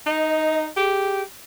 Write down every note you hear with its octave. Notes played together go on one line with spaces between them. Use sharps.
D#4 D#5
G4 G#4